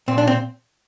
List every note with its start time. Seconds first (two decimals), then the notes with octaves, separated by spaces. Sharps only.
0.08 A#2 C4
0.18 D4
0.27 C4